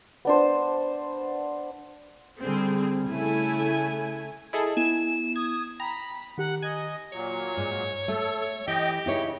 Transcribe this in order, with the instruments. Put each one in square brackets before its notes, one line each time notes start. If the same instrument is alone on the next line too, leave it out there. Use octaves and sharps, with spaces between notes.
[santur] B3 D4 C5
[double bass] D3 G3 [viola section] C4 G#4
[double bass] C#3 [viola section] A3 E4 G#5
[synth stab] E4 G#4 A4 [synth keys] D#5
[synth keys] B3 E4 [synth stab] G#5 [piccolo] E7
[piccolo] D#6 [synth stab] G#6
[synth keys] G5 [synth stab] A#5 [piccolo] B5
[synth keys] D#3 G4 A#5 [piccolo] F#5
[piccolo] D#5 [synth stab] G#5
[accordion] A#2 F#3 [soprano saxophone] C#5
[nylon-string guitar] G#2
[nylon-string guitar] A3 [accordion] A4
[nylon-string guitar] E3 [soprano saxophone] G4 [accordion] D#5 G5
[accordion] C#3 [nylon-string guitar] D#4 E4 C#5